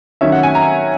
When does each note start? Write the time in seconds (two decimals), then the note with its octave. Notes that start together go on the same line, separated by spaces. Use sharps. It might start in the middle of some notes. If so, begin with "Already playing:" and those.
0.21 D#3 F#3 C#4 E5
0.32 F#5
0.43 G#5
0.55 A#5